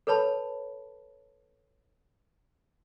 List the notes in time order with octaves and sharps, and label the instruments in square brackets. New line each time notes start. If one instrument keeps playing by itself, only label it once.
[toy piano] A4 B4 C#5 A5 B5